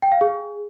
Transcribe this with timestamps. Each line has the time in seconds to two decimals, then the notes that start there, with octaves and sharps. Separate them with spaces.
0.02 G5
0.12 F5
0.21 G#4